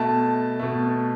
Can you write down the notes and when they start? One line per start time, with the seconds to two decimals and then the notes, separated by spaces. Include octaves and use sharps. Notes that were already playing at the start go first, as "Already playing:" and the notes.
Already playing: B2 A3 A5
0.59 B2 A3